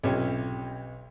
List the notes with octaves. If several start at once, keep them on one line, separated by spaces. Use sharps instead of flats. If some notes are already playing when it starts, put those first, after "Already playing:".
B1 C3 F3 C#4 G4